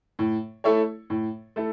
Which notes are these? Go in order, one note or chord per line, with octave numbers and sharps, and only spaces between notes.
A2
A3 E4 A4 C#5
A2
A3 E4 A4